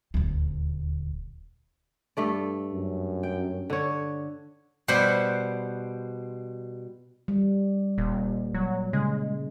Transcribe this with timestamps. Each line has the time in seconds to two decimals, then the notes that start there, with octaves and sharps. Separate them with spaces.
0.14 D#1 D2
2.17 G2 A3 D5
2.73 F#2
3.23 G5
3.70 D3 C#5
4.88 B2 G3 C5 F#5 B5
7.28 G3
7.98 D#1 A#2
8.54 F#3
8.93 C#3 G#3